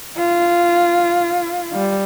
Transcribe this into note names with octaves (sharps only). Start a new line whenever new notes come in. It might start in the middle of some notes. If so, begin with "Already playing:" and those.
F4
G3